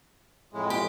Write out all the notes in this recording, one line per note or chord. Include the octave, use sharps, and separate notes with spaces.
F2 A2 G#3
G4